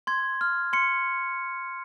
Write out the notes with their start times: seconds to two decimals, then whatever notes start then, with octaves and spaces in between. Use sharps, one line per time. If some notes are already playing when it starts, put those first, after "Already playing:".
0.07 C6 G#6
0.41 F6
0.73 C6 C#7